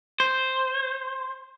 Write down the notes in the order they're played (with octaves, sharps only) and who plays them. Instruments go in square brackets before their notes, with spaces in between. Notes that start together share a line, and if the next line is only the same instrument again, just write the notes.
[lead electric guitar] C5